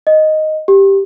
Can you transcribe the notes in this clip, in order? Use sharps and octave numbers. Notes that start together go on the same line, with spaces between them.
D#5
G4